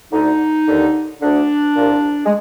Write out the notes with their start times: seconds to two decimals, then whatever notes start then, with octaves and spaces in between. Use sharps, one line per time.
0.12 D2 D3 D#4
0.66 D#2 D3
1.21 D2 D3 D4
1.76 C2 A#2
2.25 G#3